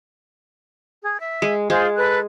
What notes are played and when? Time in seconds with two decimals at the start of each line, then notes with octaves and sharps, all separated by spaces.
1.02 G#4
1.21 E5
1.42 G#3
1.70 G#3 F4 G#4 C5
1.97 A4 B4 F#6